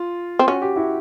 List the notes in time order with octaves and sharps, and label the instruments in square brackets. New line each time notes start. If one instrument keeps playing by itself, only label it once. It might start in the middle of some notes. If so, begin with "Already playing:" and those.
Already playing: [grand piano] F4
[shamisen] C4
[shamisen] C#4 [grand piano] F#4
[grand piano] G4
E4 F#4